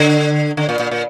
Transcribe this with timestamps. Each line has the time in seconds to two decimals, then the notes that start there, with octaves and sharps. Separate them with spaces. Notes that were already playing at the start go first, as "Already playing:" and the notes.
Already playing: D3
0.57 D3
0.69 A#2
0.80 A#2
0.91 A#2